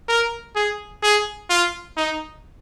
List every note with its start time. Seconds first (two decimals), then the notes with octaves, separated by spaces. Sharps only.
0.08 A#4
0.56 G#4
1.03 G#4
1.50 F4
1.97 D#4